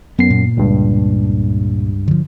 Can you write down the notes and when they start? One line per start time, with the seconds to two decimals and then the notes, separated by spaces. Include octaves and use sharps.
0.19 F#2 B3 C7
0.30 A#2
0.57 C#2 G2
2.08 D3 F3